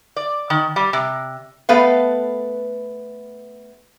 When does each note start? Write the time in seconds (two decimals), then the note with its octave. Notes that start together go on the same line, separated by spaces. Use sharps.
0.16 D5
0.50 D#3
0.76 G3
0.93 C3
1.69 A3 B3 B4 F5